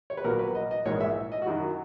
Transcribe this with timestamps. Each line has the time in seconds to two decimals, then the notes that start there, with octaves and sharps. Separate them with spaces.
0.10 C#5
0.17 B4
0.24 A#1 A#2 F#3 A#4
0.39 B4
0.55 D#5
0.71 D#5
0.86 A#1 G#2 E3 G#3 C#5
1.01 E5
1.32 D#5
1.42 F#4
1.47 F#2 D#3 F#3 E4